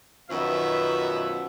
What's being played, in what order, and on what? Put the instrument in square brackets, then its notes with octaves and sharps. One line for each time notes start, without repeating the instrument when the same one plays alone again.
[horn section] F#2 B2 D#3 F3 B3 E5